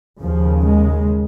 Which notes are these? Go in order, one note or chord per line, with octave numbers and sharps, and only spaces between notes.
D#2 C#3 F3
G#3